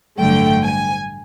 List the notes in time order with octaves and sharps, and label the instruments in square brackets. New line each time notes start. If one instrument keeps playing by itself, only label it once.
[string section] A1 G2 D3 F#3 A3 G5
G#5